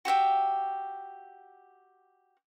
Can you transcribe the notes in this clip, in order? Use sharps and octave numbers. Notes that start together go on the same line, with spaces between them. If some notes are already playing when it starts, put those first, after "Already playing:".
F#4 G4 E5 G5